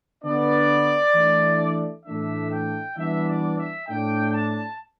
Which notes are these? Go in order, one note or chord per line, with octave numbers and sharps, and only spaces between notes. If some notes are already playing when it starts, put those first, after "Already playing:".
D3 B3 D4 D5
E3 A3 D4
A2 E3 A3 D4 E5
G5
E3 G3 B3 D4 E5
D5
E5
A2 A3 D4 G5
A5